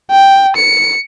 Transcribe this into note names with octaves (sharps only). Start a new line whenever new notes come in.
G5
C#7